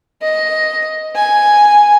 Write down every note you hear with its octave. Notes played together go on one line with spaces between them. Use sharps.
D#5
G#5